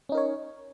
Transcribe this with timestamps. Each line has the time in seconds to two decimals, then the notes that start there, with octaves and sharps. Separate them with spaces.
0.09 C#4
0.12 D#4
0.15 A#4
0.17 C#5